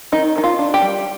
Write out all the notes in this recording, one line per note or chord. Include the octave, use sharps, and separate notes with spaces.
D#3 D#4
D#3 D#4
F4
D4
G4
G3